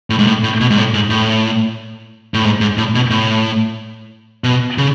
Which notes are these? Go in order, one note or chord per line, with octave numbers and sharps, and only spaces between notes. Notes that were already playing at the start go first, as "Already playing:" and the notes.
A2
G#2
A2
A2
B2
G#2
A2
G#2
A2
A2
G#2
G#2
A2
B2
A2
B2
C#3